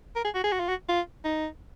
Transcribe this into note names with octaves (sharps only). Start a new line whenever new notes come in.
A#4
G#4
F#4
G#4
F#4
F4
F#4
F4
D#4